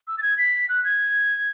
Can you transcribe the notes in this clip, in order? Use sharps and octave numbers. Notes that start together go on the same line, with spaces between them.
E6
A6
G#6
B6
F#6
G#6